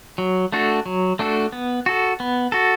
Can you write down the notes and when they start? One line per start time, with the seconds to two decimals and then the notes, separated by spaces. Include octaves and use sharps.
0.18 F#3
0.52 A3 D4 F#4 A4
0.86 F#3
1.19 A3 D4 F#4 A4
1.52 B3
1.86 F#4 A4
2.20 B3
2.52 F#4 A4